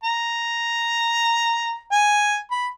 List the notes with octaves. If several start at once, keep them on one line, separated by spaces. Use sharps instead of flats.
A#5
G#5
B5